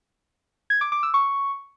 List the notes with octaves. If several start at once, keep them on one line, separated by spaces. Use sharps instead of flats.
G#6
D6
D6
E6
C#6